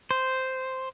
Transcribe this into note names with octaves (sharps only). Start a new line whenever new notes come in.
C5